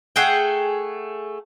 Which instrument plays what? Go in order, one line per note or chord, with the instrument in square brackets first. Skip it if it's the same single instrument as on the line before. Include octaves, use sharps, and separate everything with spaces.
[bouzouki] A3 G#4 F#5 G5